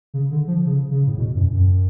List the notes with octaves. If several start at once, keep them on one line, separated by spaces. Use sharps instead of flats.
C#3
D3
F3
C#3
C#3
A2
B2
F#2
F#2